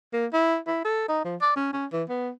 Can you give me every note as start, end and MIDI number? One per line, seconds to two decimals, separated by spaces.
0.13 0.26 58
0.33 0.57 64
0.67 0.84 64
0.85 1.08 69
1.09 1.21 63
1.25 1.36 53
1.41 1.53 74
1.56 1.72 61
1.73 1.86 61
1.93 2.03 52
2.09 2.30 59